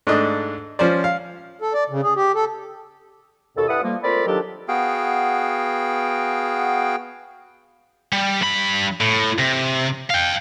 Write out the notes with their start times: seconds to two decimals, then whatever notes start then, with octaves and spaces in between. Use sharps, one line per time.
0.07 G#2 A3 D4 D#5
0.79 F3 C#4 C5 D5
1.04 F5
1.62 A4
1.74 D5
1.90 C#3
2.03 G#4
2.16 G4
2.35 A4
3.56 D#2 B2 A4
3.68 G2 E4 A4 B4 F#5 D#6
3.82 F3 G3 A#3
4.03 A3 C4 F4 A#4 D5 B5
4.27 D#3 F3 F#3 D4 G4 A4
4.68 B3 F#4 G#4 F5 G5
8.13 G3
8.42 G2 B5
9.01 A2
9.39 C3
10.10 F5 G5